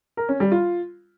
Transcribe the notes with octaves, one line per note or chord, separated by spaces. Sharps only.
A#4
C#4
G3
F4